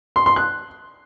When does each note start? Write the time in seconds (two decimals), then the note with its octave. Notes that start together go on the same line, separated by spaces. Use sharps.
0.16 C6
0.26 C6
0.36 F#6